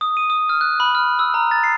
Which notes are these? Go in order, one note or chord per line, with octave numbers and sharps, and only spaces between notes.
D#6
D#7
D#6
F6
F#6
B5
F6
E6
A#5
A6
C7